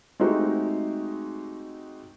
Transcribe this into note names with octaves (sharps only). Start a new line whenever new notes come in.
G#3 A3 C4 D#4 F#4 G4